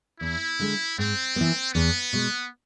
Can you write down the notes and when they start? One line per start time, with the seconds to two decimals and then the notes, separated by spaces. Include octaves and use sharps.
0.21 E2 E4
0.59 D3 G#3
0.98 G#2 C4
1.36 E3 B3
1.74 E2 B3
2.13 B2 G#3